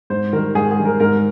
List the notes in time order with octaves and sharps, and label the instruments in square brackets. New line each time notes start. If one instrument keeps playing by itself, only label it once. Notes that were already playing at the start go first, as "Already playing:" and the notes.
[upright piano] G#2 [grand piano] C5
[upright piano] D#3 G3 [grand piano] A#4
[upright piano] G#2 [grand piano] G#4
[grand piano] G#4
[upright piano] D#3 G3
[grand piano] A#4
[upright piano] G#2 [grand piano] A#4